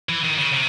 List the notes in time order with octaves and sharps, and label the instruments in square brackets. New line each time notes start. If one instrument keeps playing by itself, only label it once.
[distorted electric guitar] E3
D#3
C#3
C3